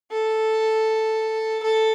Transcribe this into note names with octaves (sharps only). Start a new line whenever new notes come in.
A4
A4